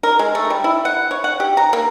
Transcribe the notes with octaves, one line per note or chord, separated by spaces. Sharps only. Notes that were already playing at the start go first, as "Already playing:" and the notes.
A#4
G#3
A3
G3
E4
F#5
C#5
F#5
G4
A#5
A#3